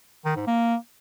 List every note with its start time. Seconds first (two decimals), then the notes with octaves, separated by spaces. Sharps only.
0.25 D#3
0.36 G#2
0.47 A#3